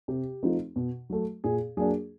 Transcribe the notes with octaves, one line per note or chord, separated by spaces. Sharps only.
C3 G4
F3 A3 C4 D#4
B2
F#3 A3
A#2 G#4
F#3 A#3 D4 G#4